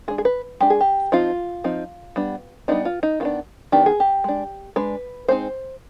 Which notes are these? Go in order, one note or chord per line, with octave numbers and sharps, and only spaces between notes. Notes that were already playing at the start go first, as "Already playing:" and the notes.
G#3 D4 G#4
G#4
B4
G#3 D4 G4
G#4
G4
F3 C4 D#4 F4
F3 C4 D#4
G3 B3 D4
G3 B3 D4 D#4
F4
D#4
D#3 B3 D4 F4
D#3 B3 D4 G4
G#4
G4
G#3 D4
G#3 D4 B4
G#3 C4 D#4 C5